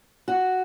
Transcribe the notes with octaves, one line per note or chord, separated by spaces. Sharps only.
F#4